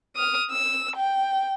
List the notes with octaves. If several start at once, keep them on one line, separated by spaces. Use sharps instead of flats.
D#6 F6
E6
G5